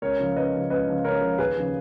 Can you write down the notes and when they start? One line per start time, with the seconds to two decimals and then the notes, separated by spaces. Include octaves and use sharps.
0.02 C#2 A#4 C#5
0.20 C#3 F3
0.36 C#2 B4 D#5
0.53 C#3 F3
0.70 C#2 B4 D#5
0.88 C#3 F3
1.04 C#2 A#4 C#5
1.21 C#3 F3
1.38 D#2 G#4 B4
1.56 C#3 F3